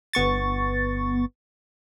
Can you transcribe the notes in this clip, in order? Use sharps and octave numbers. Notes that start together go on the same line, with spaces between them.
G1 B3 C#6 A6